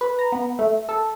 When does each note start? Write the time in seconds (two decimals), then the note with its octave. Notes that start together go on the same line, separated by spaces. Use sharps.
0.01 B4
0.19 A#5
0.32 B3
0.59 A3
0.89 A4